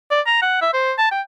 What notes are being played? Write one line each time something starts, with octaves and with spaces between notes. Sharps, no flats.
D5
A#5
F#5
E5
C5
A5
G5